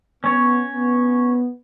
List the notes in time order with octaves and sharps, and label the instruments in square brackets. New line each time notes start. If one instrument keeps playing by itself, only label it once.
[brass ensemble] B3 [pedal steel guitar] C#4 C#5
[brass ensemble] B3